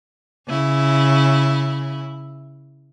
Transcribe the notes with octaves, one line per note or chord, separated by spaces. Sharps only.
C#3 E4